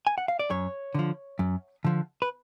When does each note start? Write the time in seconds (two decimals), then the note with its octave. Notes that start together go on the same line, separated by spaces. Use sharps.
0.07 G#5
0.18 F#5
0.28 F5
0.39 D5
0.50 F#2 C#5
0.95 D3 F3
1.39 F#2
1.84 D3 F3
2.22 B4